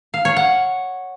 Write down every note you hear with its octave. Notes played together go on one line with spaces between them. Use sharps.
F5
C#5
F#5